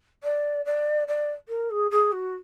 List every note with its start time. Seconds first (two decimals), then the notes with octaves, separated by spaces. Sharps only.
0.23 D5
0.65 D5
1.07 D5
1.48 A#4
1.70 G#4
1.91 G#4
2.12 F#4